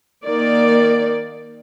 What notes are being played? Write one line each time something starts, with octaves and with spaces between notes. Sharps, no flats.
D#3 A#3 D5